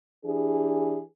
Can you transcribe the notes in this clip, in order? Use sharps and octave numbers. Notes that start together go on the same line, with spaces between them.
E3 D4 G4 G#4